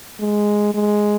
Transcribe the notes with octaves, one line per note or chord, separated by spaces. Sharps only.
G#3
G#3